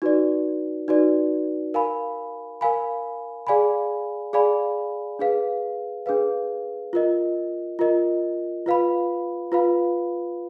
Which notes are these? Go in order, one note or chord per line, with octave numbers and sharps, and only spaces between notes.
D#4 F#4 B4 D5
D#4 F#4 B4 D5
A#4 F5 G#5 B5
A#4 F5 G#5 B5
G#4 D5 F5 G#5 B5
G#4 D5 F5 G#5 B5
D4 G#4 B4 F5
D4 G#4 B4 F5
F4 A#4 D#5
F4 A#4 D#5
F4 B4 F5 B5
F4 B4 F5 B5